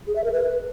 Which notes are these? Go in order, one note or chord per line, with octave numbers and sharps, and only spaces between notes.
G#4
E5
A#4
B4